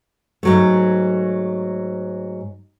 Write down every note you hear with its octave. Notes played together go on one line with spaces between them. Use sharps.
G#2 F#3 A3